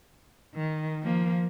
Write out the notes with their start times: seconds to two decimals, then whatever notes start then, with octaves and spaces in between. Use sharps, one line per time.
0.55 D#3
1.02 F3 A#3